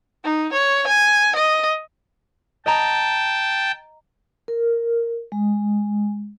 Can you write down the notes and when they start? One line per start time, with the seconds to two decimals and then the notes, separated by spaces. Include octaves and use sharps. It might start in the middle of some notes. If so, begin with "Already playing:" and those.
0.24 D#4
0.53 C#5
0.87 G#5
1.36 D#5
2.66 D#5 G5 A5 A#5
4.48 A#4
5.32 G#3